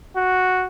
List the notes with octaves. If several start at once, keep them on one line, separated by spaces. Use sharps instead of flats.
F#4